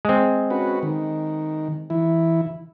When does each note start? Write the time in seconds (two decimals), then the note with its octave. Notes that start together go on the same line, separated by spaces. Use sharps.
0.05 G#3 C4
0.50 C#4 F#4 B4
0.83 D#3
1.90 E3 E4